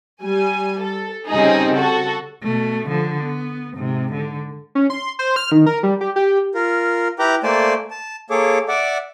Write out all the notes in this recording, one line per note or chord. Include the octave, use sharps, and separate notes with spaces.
G3 G#5
A4
C#3 G3 C4 D#4 G#4
F#4 A4
B2 A3
D3 F3
B3
G#2 C3
D3
C#4
C6
C5
F6
D#3
A#4
G3
G4
G4
F4 A#4
E4 G4 B4 G5 A#5 D6
A3 A#3 C5 D5 G#5 A5
A5
A#3 G#4 A4 C#5 D6
D5 E5 F#5 D6